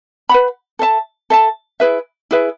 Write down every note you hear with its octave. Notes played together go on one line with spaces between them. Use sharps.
B4 F#5 B5
A4 E5 A5
A4 E5 A5
E4 G#4 B4 E5
E4 G#4 B4 E5